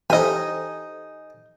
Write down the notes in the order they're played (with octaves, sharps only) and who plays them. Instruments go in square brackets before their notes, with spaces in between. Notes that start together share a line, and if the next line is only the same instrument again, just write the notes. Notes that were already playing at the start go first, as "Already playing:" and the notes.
[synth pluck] E3 A4 C5 [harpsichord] D#4 G#5 [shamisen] G4 D#5